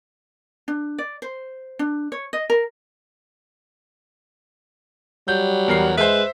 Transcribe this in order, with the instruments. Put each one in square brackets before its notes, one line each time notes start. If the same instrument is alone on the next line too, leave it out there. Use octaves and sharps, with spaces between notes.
[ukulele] D4
D5
C5
D4
C#5
D#5
A#4
[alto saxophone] F#3 [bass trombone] G3 [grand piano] G6
[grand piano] E2 A#4 C7
[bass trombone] G#3 [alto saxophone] B4 [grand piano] C5 E5